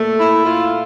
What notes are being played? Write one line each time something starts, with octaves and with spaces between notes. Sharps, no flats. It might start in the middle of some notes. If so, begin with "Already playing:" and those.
Already playing: A#2 A3 A#3
E4
F4